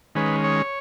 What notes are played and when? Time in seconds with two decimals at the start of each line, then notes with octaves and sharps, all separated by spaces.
0.15 D#3 G#3 C#4 B4
0.44 C#5